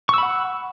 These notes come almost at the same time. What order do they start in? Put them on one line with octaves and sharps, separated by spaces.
C#6 E6 B5 F#5